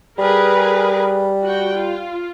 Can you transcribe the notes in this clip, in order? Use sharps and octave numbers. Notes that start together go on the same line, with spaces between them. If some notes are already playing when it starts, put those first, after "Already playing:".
G3 G#4 A#4 B4
F#4 F#5 G5
F4